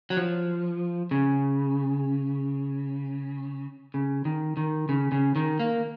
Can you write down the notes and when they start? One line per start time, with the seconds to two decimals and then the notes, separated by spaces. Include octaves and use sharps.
0.10 F#3
0.17 F3
1.11 C#3
3.94 C#3
4.25 D#3
4.57 D#3
4.89 C#3
5.12 C#3
5.36 D#3
5.60 A#3